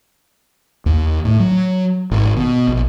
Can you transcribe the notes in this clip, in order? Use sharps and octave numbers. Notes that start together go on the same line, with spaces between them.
D#2
A2
F#3
G#1
B2
A#1